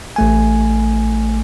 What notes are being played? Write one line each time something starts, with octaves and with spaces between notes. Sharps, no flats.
A1 A3 G#5